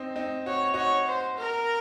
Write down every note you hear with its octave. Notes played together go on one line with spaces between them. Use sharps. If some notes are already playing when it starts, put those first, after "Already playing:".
Already playing: C4 D#4
C4 D#4
F#4 C#5
D#4 F#4 C#5
C5
A#4